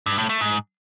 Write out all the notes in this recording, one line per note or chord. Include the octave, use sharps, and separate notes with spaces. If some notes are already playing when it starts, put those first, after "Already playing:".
G2
A2
A3
G#2